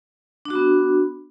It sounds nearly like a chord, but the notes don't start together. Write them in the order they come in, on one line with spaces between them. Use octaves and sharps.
D4 F#4 B3